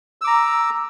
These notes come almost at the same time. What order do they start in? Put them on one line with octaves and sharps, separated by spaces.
E6 D6 A#5